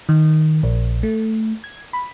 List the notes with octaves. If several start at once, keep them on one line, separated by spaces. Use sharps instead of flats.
D#3
A#1
A3
G#6
B5